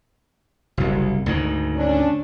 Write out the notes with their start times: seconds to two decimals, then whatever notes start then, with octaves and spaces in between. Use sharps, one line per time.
0.77 F#1 C2
1.26 D2 G#2 D#3
1.76 C#4 D4